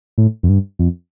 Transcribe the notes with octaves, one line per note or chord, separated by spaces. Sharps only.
A2
F2
G2
F2